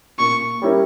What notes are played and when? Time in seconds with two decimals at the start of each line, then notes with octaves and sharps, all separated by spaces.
0.19 A#2 C#6
0.62 G3 C#4 E4 A#4